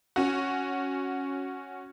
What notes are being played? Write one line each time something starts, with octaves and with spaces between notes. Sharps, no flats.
C#4 F#4